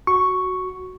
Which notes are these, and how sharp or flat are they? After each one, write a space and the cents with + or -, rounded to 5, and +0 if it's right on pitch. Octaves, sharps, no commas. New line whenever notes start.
F#4 +0 C#6 +0